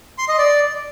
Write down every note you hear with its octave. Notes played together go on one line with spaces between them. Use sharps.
C6
D#5
D5